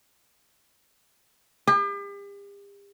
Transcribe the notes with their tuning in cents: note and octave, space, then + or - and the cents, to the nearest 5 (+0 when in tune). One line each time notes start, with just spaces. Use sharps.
G4 +40